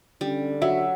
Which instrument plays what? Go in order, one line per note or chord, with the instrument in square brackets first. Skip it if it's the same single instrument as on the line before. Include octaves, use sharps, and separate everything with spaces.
[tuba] D3 [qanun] G3 [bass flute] C#4
[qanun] F#3 [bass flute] F#4 [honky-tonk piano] E5